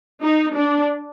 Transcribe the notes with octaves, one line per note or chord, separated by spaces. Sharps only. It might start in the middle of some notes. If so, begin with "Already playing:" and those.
D#4
D4